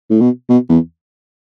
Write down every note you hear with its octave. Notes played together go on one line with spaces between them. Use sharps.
A2
B2
B2
E2